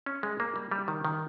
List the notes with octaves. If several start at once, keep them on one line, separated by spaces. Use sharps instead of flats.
C#4
G#3
A#3
G3
G3
D#3
D#3